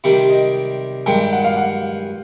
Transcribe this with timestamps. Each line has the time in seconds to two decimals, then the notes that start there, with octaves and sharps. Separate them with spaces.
0.04 C3 D#3 G3
0.29 D#5
1.06 G2 D#3 G#3 G5
1.32 F#5
1.45 F5
1.57 F#5